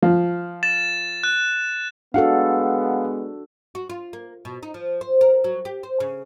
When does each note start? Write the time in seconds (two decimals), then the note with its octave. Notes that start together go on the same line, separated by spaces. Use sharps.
0.02 F3
0.63 A6 E7
1.23 F#6
2.14 G#3 B3 D4 F#4 A4 F5 F#5
3.75 F#4
3.90 F4
4.13 A#3
4.45 B2
4.63 D#4
4.74 F3
5.01 C5
5.21 A#4
5.44 F#3
5.65 G4
5.83 C5
6.00 C#3